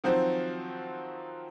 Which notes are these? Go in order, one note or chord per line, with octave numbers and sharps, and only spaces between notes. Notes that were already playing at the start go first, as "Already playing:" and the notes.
D#3 F3 F#3 C4 F#4 C5